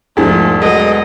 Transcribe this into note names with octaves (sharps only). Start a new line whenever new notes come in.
E1 G#2 F3 A3 G#4
F#3 G#3 A4 B4 D#5